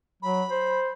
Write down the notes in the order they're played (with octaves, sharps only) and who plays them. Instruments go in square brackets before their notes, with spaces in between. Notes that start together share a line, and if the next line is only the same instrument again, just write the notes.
[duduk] F#3 [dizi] B5
[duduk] C5